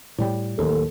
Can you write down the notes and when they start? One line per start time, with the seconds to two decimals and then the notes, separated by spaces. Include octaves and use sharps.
0.18 A2 G3
0.59 D1 D#2 A4